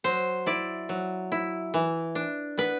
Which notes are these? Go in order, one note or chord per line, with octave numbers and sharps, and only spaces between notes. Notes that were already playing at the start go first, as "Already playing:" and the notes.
F#3 C5
E4 D5
F#3
E4
E3
D4
B3 B4